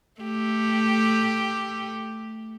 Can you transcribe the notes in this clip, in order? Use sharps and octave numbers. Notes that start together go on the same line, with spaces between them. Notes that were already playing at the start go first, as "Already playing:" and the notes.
A3 G4